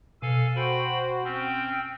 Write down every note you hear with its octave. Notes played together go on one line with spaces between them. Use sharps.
B2 A4 F5 G#5
F#4 C5 G5 B5
C4 C#4 G5